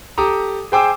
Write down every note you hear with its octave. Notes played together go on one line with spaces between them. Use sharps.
G4 A4 A#5 D6 D#6
G#4 C5 G5 G#5 D6 E6